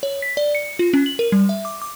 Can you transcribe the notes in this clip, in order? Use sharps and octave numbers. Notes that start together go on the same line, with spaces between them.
C#5
B6
D5
C#7
F4
C#4
F#7
A#4
G3
E5
D6
D6